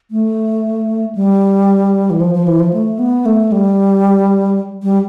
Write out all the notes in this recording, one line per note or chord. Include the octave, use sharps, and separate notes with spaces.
A3
G3
E3
F3
F3
E3
F3
A3
B3
A3
G3
G3